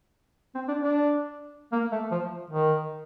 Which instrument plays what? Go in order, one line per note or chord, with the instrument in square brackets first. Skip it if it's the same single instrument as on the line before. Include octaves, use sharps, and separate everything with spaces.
[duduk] C4
D4
D4
A#3
A3
F3
D#3